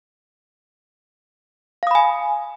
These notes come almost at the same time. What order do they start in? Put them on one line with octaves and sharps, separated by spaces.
F5 D#6 B5 G#5